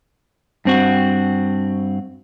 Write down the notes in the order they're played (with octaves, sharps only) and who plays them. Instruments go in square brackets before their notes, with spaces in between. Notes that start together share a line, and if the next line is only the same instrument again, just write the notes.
[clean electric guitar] G2 C4 F#4